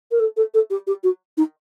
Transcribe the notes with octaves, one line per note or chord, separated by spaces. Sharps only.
A#4
A4
A4
A4
G4
G4
F#4
D#4